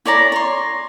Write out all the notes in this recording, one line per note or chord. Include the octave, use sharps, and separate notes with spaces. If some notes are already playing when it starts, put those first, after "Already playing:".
E4 C#5 D5 A#5
C#5 C6